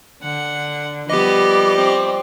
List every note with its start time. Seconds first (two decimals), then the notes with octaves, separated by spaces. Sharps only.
0.23 D3 F#5
1.10 F3 G3 B3 G4 D#5 D6
1.77 C4